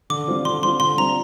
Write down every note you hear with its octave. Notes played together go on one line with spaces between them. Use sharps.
D3 D6
G3 C4 F4
D3 C6
G3 C4 F4 C6
D3 C6
G3 C4 F4 A#5